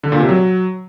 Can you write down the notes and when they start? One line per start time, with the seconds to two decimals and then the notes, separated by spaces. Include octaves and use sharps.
0.04 D3
0.12 A#2
0.20 C3
0.29 F#3